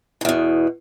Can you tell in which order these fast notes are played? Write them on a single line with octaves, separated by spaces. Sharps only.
G#2 E2 B2